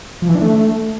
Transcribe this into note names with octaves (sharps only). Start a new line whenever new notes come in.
F3
E3
D4
A3